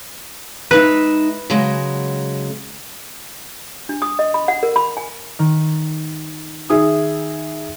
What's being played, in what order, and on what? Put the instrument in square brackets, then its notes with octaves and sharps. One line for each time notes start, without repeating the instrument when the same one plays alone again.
[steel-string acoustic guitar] G#3 D#4 E5 [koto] B4
[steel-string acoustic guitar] C#3 F#3 G#3
[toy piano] D4
D#6
D#5
B5
F#5
A#4
B5
G#5
[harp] D#3
[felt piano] D#3 G#4 E5 [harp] D#6